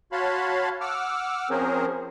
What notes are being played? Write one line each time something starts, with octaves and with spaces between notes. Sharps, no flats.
F#4 C#5 F5 A5 B5 C6
F#5 D6 E6 F6
F3 C4 C#4 G#4 A#4 C5